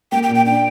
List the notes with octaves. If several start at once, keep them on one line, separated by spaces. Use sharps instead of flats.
A#3 G5
G5
A#2
G5
D4 G5